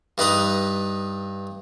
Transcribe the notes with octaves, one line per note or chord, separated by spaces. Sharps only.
G2 D#4 B4 D#6